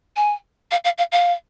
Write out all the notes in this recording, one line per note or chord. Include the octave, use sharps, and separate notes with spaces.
G#5
F5
F5
F5
F5